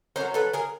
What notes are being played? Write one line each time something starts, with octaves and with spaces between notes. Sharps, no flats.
F#3 A#3 C#4 A#4 C5
A4 B4
G#4 A#4